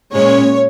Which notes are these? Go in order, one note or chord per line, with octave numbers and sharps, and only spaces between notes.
A#2 G#3 C#4 C#5